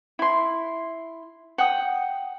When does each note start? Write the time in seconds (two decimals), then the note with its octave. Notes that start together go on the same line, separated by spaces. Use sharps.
0.19 E4 C6
1.58 F#5 G5 D#6